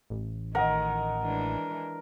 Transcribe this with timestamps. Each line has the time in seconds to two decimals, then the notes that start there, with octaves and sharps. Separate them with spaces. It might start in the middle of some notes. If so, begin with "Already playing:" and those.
0.10 A1
0.55 D#3 A#4 D#5 F#5
1.22 E3 G#3 D4